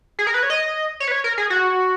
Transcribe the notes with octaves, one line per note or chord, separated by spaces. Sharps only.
G#4
A#4
B4
C#5
D#5
C#5
B4
C#5
A#4
G#4
F#4